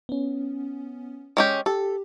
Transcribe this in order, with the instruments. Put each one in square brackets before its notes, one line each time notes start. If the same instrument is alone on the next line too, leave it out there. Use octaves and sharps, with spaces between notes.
[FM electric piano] B3 C#4
[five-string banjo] G#3 C#4 G4
[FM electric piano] G4 [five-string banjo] A4